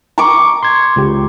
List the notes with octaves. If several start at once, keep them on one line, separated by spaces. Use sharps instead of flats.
A#5 C#6 D6
C6 G#6
C#2 G4